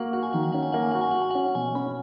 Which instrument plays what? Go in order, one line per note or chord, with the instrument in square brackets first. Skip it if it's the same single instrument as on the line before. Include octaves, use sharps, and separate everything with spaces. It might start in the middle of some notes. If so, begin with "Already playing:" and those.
Already playing: [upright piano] A#3 F#4 [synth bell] F#5
[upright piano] F#4 [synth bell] F#5
[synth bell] G#5
[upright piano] D#3 [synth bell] F#5
[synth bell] G#5
[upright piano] C#4 [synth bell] F#5
[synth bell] G#5
[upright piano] A#3 [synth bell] F#5
[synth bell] G#5
[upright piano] F#4 [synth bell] F#5
[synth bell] G#5
[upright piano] F#4 [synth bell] F#5
[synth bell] G#5
[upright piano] C#4 [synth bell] F#5
[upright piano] B2 [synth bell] G#5
[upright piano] C#4 [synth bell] B5